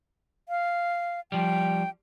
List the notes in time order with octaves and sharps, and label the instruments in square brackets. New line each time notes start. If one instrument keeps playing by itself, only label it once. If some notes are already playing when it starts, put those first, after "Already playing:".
[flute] F5
[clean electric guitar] F3 G3 [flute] G5